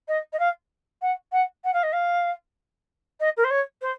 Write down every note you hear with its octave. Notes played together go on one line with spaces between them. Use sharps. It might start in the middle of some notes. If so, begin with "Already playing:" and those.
D#5
D#5
F5
F#5
F#5
F#5
F5
D#5
F5
D#5
A#4
C5
C#5
C5